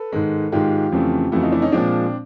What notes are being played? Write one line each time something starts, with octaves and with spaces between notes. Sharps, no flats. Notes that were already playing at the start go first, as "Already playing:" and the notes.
Already playing: A4 B4
G#2 D#3 G#3
G#2 D#3 G#3 F4 G4
F2 C#3 E3 A3
F2 C#3 E3 A3 E4 F#4
D#4 F4
D4 E4
C#4 D#4
A#2 F3 G#3 C4 D4